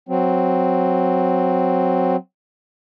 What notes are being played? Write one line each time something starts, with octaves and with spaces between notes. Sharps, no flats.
F#3 C4